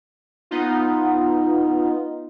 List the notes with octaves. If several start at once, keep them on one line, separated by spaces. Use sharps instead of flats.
B3 D#4 F4